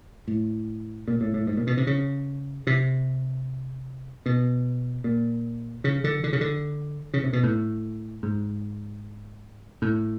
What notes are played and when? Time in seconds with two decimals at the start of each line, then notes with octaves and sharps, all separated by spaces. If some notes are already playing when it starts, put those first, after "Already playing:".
0.28 A2
1.08 A#2
1.21 A2
1.34 A2
1.47 G#2
1.57 A#2
1.67 B2
1.77 C3
1.87 C#3
2.67 C3
4.26 B2
5.04 A#2
5.84 C#3
6.04 D3
6.24 D3
6.33 C#3
6.41 D3
7.14 C#3
7.23 C3
7.33 B2
7.43 A2
8.23 G#2
9.82 A2